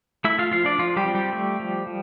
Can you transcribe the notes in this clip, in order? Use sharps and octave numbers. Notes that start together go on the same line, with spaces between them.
A3 E4 E5
F4 F5
F3 F4 F5
D4 D5
F3 F4
G3 G4
C4
G3 G4
A3
F3
F3